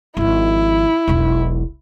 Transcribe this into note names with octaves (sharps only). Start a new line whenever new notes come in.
G#1 F3 E4
E1 B1